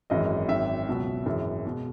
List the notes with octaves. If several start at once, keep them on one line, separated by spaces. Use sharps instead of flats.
G#1 F#2 E3 G#3 D#5
G#1 F#2 D#3 E5
C#2 B2 F#3
G#1 F#2 E3 G#3
B2 G#3